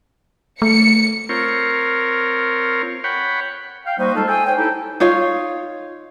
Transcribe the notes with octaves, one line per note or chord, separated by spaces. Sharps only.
A3 C#7
C4 F4 A#4 C#5
C#5 F#5 G5 B5
F5 G5
G3 A#3 D#4 F#4 C5
G#3 D#4 F4 A4
A4 C5 E5 G5 G#5
C5 C#5 G5
D#4 E4 G4 A4
D#4 F4 C#5 F5